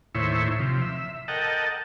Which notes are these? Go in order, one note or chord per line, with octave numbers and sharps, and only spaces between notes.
D#2 A2 E4 C5 C#5 E5
C3 F3
E5
A4 A#4 D#5 F#5 G5 A5